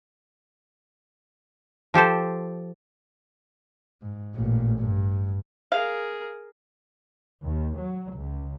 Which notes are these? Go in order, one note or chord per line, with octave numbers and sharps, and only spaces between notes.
F3 G4 A4 C5
G#2
A1 A#2
G2
G#4 A#4 F5
D#2
F#3
C#2